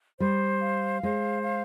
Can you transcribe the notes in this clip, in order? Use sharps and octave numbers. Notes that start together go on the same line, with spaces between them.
G3 C5
F5
G#3 C5
F5